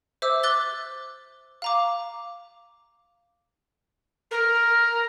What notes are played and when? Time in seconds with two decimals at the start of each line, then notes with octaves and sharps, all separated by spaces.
0.22 C5 E5 D6 E6
0.43 D6 F#6 A6 G7
1.62 F5 A#5 D6
4.30 A#4